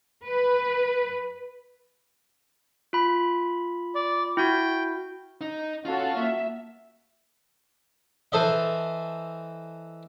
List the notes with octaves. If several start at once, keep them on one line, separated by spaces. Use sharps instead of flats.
B4
F4 B5
D5
E4 F#4 G5
D#4
C#4 F4 F#4 A4
A#3 E5
E3 A4 C5 D#5 E5